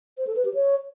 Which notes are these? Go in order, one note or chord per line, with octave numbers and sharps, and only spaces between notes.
C5
A4
B4
G4
C#5